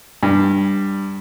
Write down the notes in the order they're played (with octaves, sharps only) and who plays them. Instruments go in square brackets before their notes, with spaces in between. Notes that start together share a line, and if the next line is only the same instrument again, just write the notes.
[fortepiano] G2